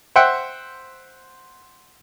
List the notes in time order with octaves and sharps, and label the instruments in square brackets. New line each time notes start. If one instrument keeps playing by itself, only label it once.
[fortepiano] C5 E5 F#5 G5